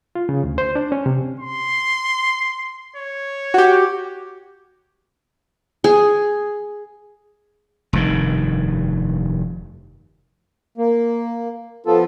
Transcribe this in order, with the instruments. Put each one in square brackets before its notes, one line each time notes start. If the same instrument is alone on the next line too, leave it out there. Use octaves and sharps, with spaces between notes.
[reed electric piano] F4
C#3
D2
C5
D4
C#4
C3
[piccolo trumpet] C6
C#5
[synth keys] F#4 G4
[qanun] G#4
[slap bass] F1 G2 D#3
[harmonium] A#3
[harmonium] F3 B3 F4 [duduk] A4